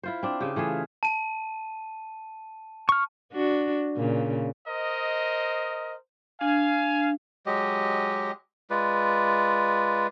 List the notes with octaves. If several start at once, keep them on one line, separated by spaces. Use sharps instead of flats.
E4 F4 C5
C4 D4
C#3 G4
E3 A3 F4 G#4
A5 D#7
C#6 F6
D4 F#4
A#2 C#3
A#4 C5 D#5
D4 F5 G#5
F#3 G#3 G4 D#5
G#3 F4 B4 D5